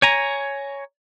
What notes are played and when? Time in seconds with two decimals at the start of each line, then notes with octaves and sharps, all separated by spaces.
0.02 C#5 G#5 A#5